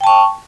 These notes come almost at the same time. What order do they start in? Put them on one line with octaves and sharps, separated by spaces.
G5 A5 C#6